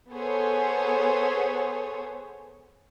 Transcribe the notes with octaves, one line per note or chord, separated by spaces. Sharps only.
B3 G#4 A4 C5 C#5